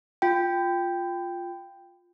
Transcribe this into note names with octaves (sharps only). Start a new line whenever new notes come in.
F4 G5